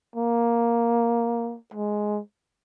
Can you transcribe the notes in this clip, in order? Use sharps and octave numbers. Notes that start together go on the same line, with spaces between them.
A#3
G#3